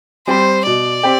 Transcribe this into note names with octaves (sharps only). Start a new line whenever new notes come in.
G3 C4 G4 C5
B2 D5
C4 G4